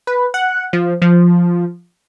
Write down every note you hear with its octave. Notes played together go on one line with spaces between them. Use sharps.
B4
F#5
F3
F3